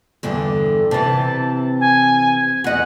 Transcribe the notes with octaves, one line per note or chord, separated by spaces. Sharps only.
E2 G2 D3
C3 E3 A5
G#5
E2 D#5 F#5